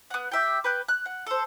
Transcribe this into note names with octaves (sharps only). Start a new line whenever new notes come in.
B3 F#5
G4 E5 G5
B4 G5 F#6
F#6
F#5
A4 C5